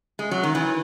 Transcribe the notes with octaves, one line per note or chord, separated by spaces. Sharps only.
G#3
F#3
D#3
E3